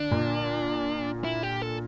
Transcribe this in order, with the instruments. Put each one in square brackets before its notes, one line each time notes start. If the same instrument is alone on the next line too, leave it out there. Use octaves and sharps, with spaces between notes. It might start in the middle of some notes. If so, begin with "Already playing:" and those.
Already playing: [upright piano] D3 [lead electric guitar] D4
[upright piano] A#2
[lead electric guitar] E4
G4
A4